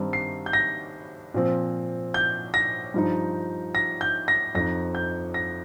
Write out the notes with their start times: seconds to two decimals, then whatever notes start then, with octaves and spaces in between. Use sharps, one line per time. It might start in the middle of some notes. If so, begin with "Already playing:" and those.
Already playing: G2 D#3 C4 D#4
0.13 C7
0.46 G6
0.53 A#6
1.34 A#2 F3 C4
2.14 G6
2.54 A#6
2.94 G2 F3 D#4
3.75 A#6
4.01 G6
4.28 A#6
4.55 F2 F3 D#4 A#6
4.95 G6
5.34 A#6